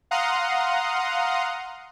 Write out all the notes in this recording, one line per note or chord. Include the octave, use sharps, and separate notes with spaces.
F5 F#5 A#5 C6 D#6